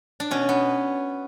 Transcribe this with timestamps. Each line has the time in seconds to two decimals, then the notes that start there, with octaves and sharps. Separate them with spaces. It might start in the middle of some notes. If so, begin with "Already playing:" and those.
0.20 D4
0.31 B2 C#4
0.49 B3